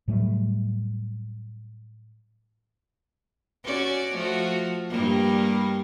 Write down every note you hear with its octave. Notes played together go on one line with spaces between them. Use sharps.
A2 F#3 G3 A3
C#4 F#4 D5
F3 A3 F#4
G2 G3 A#3